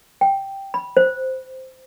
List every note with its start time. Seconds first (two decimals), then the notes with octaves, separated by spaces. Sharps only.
0.21 G5
0.74 B5
0.97 C5